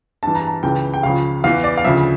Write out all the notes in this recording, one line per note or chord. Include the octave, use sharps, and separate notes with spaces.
G2 E3 A5
A#5
A5
C#2 C#3 E3 G5
G5
C#2 C#3 F3 F5
E2 E3 F5
D5
F5
D2 C#3 F3 E5